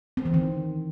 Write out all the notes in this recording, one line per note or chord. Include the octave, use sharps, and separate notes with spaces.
C4
E3
D#3